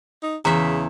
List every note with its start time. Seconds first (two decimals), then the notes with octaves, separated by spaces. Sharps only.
0.23 D#4
0.45 E2 C#3 E5 A#5